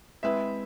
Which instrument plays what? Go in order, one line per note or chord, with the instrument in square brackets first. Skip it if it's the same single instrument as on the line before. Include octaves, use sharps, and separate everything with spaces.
[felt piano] G#3 C4 E4 B4 [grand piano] E5